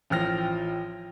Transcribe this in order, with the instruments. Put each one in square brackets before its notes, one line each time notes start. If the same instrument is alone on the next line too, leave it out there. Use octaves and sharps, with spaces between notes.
[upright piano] A1 F3 G5 F6 A#6